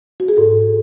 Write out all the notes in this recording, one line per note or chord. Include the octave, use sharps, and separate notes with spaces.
F#4
G#4
G#2 A4